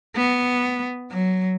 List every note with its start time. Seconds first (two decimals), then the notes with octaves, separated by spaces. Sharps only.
0.16 B3
1.11 F#3